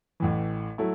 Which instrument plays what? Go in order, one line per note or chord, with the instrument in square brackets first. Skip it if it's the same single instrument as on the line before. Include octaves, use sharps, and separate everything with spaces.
[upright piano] A1 A2 E3
F#3 A3 E4